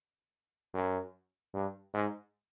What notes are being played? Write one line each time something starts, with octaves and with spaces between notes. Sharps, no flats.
F#2
G2
G#2